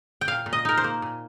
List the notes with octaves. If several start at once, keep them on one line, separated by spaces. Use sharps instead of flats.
G5
A#2 F5
A#2
D#5
D#4 A#4
C5
A#3
A#2